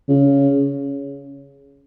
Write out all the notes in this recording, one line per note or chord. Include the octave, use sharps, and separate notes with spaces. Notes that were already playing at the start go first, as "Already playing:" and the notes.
C#3